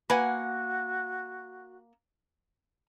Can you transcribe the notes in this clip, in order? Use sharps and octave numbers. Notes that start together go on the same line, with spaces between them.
A#3 F#4 B4 F#5 G#5